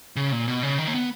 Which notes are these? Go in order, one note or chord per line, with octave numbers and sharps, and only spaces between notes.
C#3
A#2
B2
C#3
D#3
A#3
B3